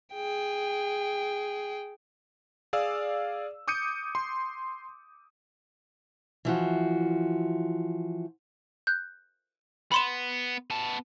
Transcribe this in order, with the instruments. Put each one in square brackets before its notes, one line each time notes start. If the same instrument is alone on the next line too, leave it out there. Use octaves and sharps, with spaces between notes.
[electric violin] G#4 G5
[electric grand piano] G#4 D5 F5 E6
D6 D#6 G6 C#7 D#7
C6
[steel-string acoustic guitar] E3 F3 F#4
[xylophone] F#6 G6
[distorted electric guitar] B3 [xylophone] B5 C6 E7
[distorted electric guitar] B3 A5